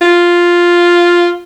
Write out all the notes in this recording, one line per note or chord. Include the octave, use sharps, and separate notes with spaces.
F4